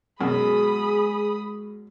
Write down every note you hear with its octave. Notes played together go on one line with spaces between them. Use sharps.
F#2 B2 G#3 G#4 B5 D#6